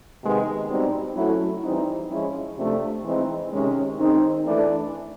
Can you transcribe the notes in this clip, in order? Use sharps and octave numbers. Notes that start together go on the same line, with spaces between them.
C3 D#3 G#3 B3
B2 G3 C4 D#4
F#3 A3 C#4 E4
E3 G3 C4 D#4
F3 G#3 C#4 E4
C3 F3 A3 D4
E3 G#3 C4 D#4
C3 D#3 G#3 C#4
D#3 G#3 C4 D#4
E3 A3 D4